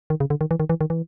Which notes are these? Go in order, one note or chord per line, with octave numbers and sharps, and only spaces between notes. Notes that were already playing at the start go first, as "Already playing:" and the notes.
D#3
C#3
D3
D#3
E3
D#3
E3
D#3
E3